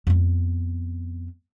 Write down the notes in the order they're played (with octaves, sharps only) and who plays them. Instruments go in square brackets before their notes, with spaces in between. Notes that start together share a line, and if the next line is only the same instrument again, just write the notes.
[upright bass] F2 B3